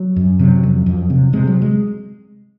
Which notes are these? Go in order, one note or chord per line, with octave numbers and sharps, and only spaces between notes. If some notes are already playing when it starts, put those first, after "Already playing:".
Already playing: F#3
F#2
C3 F#3
F2
F2
C3
C3 G#3
F#3
G#3